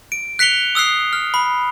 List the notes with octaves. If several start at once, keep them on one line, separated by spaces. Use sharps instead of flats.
D7
F#6 B6 C#7 F7 G7
D#6 E6 F#6 C7
F6
B5